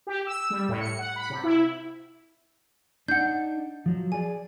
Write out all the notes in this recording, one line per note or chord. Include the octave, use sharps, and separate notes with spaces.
G4
E6
G3
A2
C#7
F#5
B5
C3
E4
D4 D#4 F#5 G6
F3 F#3
G#4 D5 G#5